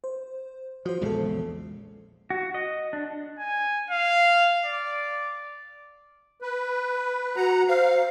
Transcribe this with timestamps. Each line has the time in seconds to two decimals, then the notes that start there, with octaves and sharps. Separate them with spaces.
0.04 C5
0.85 F3 F#4 C5
1.01 A#1 E2 C#3 G#3 A4
2.30 F#4
2.55 D#5
2.93 D4
3.39 G#5
3.90 F5
4.65 D5
6.42 B4
7.36 F#4 F#5 A#5
7.68 C5 F5